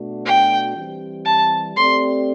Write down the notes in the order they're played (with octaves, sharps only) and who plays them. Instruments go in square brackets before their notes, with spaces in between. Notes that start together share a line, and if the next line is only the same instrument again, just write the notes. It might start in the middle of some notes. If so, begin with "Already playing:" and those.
Already playing: [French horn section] B2 A3 D4 F#4
[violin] G5
[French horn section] E3 G3 C4 G4
[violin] A5
[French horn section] A3 C4 G4 D5 [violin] C6